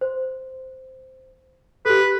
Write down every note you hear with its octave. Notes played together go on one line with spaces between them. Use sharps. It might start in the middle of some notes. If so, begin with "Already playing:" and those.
C5
G4 A4 B4